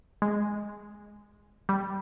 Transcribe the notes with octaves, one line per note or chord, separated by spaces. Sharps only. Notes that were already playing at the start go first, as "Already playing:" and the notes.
G#3
G3